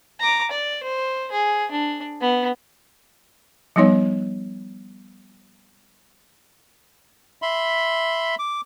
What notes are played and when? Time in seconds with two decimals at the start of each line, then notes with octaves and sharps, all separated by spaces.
0.20 A#5 D6
0.51 D5
0.83 C5
1.32 G#4
1.72 D4
2.21 B3
3.76 F3 G3 B3 D#4 C#5
7.42 E5 B5 C6
8.39 D6